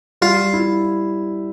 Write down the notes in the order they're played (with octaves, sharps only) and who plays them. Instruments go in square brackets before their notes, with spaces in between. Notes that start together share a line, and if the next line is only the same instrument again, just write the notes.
[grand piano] G3 [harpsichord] F4
[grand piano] E4